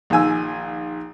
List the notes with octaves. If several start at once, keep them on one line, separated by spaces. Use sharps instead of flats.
A#1 D#3 G#5 E6